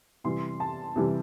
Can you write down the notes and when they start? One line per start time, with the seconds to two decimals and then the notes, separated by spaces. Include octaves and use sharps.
0.24 C3 E3 G3 C6
0.60 A5
0.96 C3 E3 G3